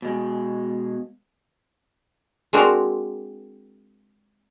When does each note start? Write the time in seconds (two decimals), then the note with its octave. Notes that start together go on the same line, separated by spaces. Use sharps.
0.02 B2 G#3
2.53 G#3 C4 D4 F#4 A#4